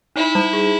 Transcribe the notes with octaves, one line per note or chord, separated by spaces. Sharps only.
D#4 E4
G3
G#4